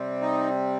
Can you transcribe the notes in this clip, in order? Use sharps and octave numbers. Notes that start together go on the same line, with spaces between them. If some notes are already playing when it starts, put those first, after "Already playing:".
Already playing: C3 G3 C4
D#4